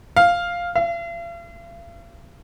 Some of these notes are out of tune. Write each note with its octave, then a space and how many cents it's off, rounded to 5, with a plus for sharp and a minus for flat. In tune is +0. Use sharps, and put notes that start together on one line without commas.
F5 +0
F5 -45